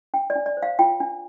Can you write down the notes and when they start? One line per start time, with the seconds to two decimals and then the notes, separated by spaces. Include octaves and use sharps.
0.14 D4 G5
0.30 D5
0.35 D4
0.46 D5
0.57 C5
0.63 F5
0.79 F4 G5
1.00 D4